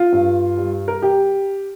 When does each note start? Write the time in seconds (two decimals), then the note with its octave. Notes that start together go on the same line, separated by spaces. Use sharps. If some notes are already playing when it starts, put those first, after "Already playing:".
Already playing: F4
0.12 G2
0.57 G3
0.88 A#4
1.02 G4